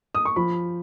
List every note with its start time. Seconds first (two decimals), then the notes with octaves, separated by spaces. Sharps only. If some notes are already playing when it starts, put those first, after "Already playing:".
0.15 D#6
0.25 C#6
0.36 F3 B5